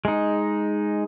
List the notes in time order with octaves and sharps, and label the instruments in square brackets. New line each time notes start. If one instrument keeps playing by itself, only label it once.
[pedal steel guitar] G#3 D#4